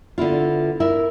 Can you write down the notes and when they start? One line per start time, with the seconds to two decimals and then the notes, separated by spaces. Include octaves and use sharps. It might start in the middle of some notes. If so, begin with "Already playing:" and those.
0.18 D3 B3 E4 F4
0.80 E4 A#4 E5